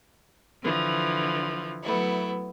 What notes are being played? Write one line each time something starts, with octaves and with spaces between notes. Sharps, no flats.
D3 E3 F3
F#3 A3 B3 E4